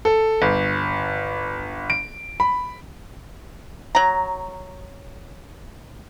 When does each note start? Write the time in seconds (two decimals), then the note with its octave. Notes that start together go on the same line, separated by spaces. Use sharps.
0.05 A4
0.42 G1
1.90 D7
2.40 B5
3.95 F#3 A#5